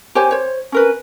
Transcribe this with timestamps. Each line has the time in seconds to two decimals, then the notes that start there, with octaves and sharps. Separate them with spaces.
0.15 G4 C5 C#5 G#5
0.31 C5 C#5
0.72 C#4 A#4 B4